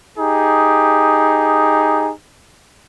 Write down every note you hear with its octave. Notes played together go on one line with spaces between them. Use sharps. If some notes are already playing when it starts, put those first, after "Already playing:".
D#4 G4 G#4